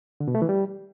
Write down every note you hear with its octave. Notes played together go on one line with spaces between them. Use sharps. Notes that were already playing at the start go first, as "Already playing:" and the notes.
D3
B2
A3
E3
G3